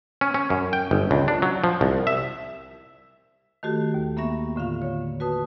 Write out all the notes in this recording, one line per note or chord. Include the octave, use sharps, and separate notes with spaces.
C#4
C#4
F#2
G5
G1
C#2
D4
F#3
F3
C2
E5
D#3 A3 F#4 G4 A4
D#2
A#3 B3 E5 C#6 A#6
A2 D3 F4 F5
C#5
F#4 B4 A5 D#6